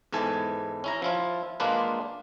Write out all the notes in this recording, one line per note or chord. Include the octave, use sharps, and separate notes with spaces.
E2 G#2 E3 A4 G#5
C#4 E4 A#5
F3 E4 F4
G#3 A#3 D4 F4 B4